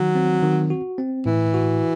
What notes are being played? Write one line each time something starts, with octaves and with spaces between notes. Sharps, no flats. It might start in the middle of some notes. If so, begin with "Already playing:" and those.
Already playing: D#3 F#3
C4
D#3
F#4
C4
A2 E3
F#4